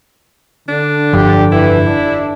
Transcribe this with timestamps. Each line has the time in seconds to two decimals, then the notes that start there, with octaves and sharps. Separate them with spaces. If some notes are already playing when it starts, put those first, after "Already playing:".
0.69 D3 D4
1.13 F1 G2 F3 G4
1.52 E3 E4
1.86 D4